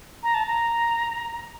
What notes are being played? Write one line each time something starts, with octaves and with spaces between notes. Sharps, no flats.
A#5
A5
A#5